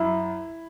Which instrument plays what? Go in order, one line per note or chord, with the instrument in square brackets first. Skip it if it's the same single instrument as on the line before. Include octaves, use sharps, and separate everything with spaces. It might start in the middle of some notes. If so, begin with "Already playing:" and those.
Already playing: [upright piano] F#2 E4